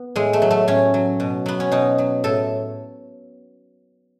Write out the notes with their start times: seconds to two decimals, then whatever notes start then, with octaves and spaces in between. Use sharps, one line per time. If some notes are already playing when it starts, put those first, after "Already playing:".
Already playing: B3
0.16 A2 G#3
0.33 A3
0.42 F#3
0.51 A3
0.68 A2 C#4
0.94 F#3
1.20 B2
1.46 F#3 B3
1.60 C#4
1.72 B2 D#4
1.98 F#3
2.24 A2 A4